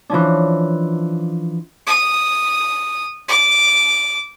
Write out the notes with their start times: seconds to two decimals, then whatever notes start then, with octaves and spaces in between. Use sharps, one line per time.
0.10 E3 F3 C#4 D4
1.86 D#6
3.28 D6